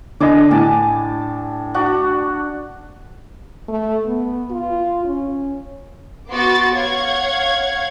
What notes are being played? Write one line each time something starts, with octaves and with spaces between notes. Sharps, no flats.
D3 D4 G#4 D#5 D6
A2 G4 G#5 A5
D4 F#4 F#5
A3
B3
F4
C#4
B3 F#4 C6 D6 A6
C#5 F5 F#5 G#6